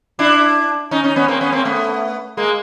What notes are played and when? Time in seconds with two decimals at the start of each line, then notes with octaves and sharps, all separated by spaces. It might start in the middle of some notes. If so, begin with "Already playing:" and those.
0.19 D4 E4
0.91 C#4 D#4
1.04 C#4 D#4
1.16 B3 C#4
1.28 A#3 C4
1.41 B3 C#4
1.52 A#3 C4
1.65 A3 B3
2.37 G#3 A#3